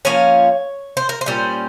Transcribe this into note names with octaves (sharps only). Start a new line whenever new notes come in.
F3 A#3 C#4 C#5
C5
A#4
C5
A#2 G3 C#4